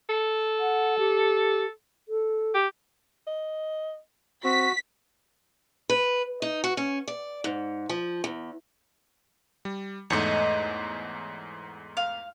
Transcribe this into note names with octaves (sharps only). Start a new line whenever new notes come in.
A4
F#5
G4
A4
G4
D#5
C4 F#4 B6
B4
D#4
F#4
C#4
D5
G#2
F3
E2
G3
E2 G#2 A3 C#5 D#5
F5